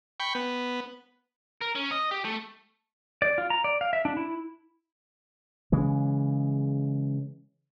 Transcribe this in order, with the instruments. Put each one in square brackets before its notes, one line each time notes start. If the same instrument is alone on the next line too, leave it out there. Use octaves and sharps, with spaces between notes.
[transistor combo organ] G5 B5 C#6
B3
[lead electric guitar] A#4
C#4
D#5
G4
A3
[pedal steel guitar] D5
F4
A#5
D5
F5
E5
D4
E4
[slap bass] C#3 E3 G#3